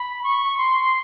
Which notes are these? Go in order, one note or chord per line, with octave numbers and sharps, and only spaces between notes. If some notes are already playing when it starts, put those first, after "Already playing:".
Already playing: B5
C#6
C6